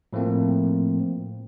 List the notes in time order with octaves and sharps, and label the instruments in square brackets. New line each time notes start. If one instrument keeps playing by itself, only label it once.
[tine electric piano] A2 F3 A3 A#3 C4